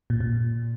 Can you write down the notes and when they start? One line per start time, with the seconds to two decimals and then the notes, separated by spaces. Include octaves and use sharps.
0.10 A#2
0.20 A#2